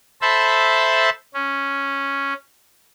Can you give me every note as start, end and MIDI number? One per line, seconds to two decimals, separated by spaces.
0.22 1.10 69
0.22 1.10 72
0.22 1.10 76
0.22 1.10 81
0.22 1.10 83
1.34 2.33 61